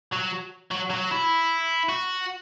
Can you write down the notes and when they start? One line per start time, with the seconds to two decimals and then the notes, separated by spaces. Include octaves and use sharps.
0.13 F#3
0.71 F#3
0.90 F#3
1.11 E4
1.89 F#4